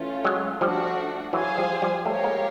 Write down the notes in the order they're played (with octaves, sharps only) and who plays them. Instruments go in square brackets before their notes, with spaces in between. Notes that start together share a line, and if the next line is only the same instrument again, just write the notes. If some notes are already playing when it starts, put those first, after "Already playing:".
Already playing: [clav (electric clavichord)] E3 [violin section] A3 C#4 F4
[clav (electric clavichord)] F#3 G#3
[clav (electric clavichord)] F3 G3 [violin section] A3 D4 F#4
[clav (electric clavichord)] E3 F#3 [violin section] G#4 C5 F5 G#5
[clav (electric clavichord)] F3 G3
F3 G3
[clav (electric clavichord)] G3 A3 [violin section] G4 A#4 C#5 F5
[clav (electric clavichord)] G#3 A#3